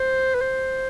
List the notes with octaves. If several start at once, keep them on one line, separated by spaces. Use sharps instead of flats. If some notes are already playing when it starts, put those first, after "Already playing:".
Already playing: C5
B4
C5